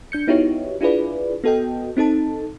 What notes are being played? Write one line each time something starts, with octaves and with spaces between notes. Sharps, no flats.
D4 G6 C#7
B3 D#4 E4 F#4 G4 C#5
D4 E4 F4 G#4 B4 D5
B3 F#4 A4 D#5 G5
C4 D#4 A4 A5